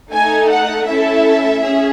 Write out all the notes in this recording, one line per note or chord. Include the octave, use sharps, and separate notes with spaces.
A3 D#4 A4 G#5
F#5
A3 C#4 E4 A4 E5
C#4 G#4